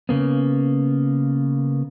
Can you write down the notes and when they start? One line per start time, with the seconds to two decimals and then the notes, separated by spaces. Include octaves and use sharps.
0.09 C#3 A#3 B3